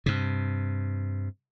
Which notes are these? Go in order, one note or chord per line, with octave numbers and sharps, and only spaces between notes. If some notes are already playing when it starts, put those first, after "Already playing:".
G2 C3